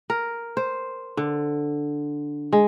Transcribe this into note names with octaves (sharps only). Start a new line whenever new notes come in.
A#4
C5
D3
G#3